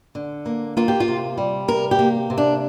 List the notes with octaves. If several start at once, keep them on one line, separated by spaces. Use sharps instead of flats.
D3
A#3
A#3 F4
G4
F4
C3
G3
C3 A#4
G4
A#3
C3
D4